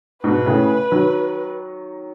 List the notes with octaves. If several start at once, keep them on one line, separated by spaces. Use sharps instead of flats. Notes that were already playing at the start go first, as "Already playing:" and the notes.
G#2 B2 B4
A2 C#3
D#3 F#3